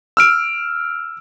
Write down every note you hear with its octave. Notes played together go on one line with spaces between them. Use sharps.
E6 F6 D7